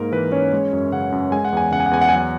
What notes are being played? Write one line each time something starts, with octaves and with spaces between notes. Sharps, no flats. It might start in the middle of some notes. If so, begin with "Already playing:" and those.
Already playing: G#2 A#3 A#4
E3 B4
C#4 C#5
G#3
F#2
C#3 F#5
F#2
G#3 G#5
F#5
E2 G#5
C#3 F#5
G#5
F#5
E2 G#5
F#5
G#5
F#3 F#5